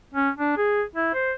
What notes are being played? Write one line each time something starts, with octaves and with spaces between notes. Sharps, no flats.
C#4
D4
G#4
E4
C5